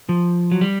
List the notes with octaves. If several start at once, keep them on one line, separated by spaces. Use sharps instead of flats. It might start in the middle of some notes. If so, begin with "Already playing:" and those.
F3
F#3
G3